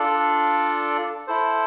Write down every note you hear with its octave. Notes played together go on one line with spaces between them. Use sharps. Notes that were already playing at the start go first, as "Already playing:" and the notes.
Already playing: D4 F4 A4 D5
E4 A4 C5